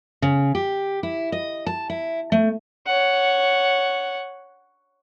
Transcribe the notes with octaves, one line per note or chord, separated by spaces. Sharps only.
C#3
G4
E4
D#5
A5
E4
A3
C#5 F#5